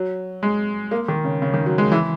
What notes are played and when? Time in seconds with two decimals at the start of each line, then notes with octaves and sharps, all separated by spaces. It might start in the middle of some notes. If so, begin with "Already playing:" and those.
Already playing: F#3
0.43 G#3
0.91 A#3
1.08 D#3
1.24 C#3
1.42 C#3
1.54 D#3
1.66 F#3
1.78 G#3
1.92 E3